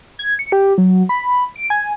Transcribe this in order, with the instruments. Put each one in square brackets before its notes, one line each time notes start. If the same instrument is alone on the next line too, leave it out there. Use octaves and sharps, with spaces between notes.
[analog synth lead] G#6
C#7
G4
F#3
B5
D7
G#5